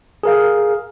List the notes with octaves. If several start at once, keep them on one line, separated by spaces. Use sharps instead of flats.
G#4 A#4 F5